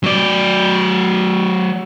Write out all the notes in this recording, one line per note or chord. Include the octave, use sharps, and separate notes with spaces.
F#3 D5